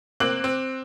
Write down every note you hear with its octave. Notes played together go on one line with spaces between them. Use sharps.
A#3 C4 D6 F#6 F#7
C4